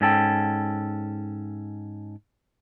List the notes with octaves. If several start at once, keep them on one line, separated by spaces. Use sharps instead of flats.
G#2 C#4 A4 G5